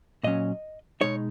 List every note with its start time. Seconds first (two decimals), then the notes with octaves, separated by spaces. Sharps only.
0.23 A#2 F#3 C#4 D#5
1.01 B2 G#3 D#4 C#5